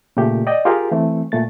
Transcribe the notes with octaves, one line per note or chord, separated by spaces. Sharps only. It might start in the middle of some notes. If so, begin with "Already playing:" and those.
A#2 C#3 A3 G4
D5 D#5 G5
F4 G4 G#4 A#4
E3 A3 C4
A#2 A3 A6